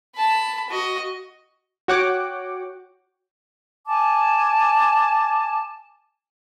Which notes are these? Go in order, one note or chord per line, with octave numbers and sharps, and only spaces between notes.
A5 B5
F#4 D#5
F#4 C#5 F#5 G5 D6
G#5 A5 D6